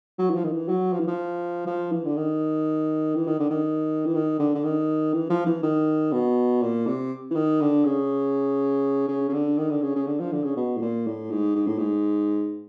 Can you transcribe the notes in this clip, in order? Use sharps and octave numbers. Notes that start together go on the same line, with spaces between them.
F#3
E3
F3
D#3
E3
F#3
F3
E3
F3
F3
E3
D3
D#3
E3
D#3
D3
D#3
E3
D#3
D3
D3
D#3
E3
F3
E3
D#3
B2
A#2
C3
E3
D#3
D3
C#3
C#3
C#3
D3
D#3
D3
C#3
C#3
D3
F3
D3
C#3
B2
A2
A#2
A2
G#2
G#2
A2
G#2